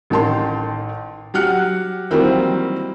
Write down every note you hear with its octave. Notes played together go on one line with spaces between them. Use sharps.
A1 D#3 A5 C6
F#3 G4 F#5 F6 F#6 C#7
D#3 E3 F#3 G3 A#3 C4